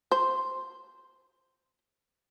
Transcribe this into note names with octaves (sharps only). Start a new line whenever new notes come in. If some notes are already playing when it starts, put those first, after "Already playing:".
C5